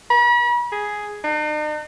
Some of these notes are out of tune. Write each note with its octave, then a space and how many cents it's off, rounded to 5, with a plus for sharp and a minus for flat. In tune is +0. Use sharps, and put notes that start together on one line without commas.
B5 -40
G#4 +5
D#4 -45